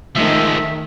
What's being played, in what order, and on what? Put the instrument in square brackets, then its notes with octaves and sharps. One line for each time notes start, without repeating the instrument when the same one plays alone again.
[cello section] D#3 [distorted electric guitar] F3 G#3 [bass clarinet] A3 [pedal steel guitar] E5